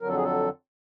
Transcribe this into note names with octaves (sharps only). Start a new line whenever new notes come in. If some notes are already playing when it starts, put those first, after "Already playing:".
F2 D3 F#3 A#4
A4
G#4
A4